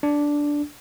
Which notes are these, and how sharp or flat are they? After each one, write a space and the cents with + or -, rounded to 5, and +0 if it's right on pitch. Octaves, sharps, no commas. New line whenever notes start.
D4 -5